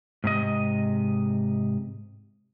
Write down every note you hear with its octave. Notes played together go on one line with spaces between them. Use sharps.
G#2 C3 D#5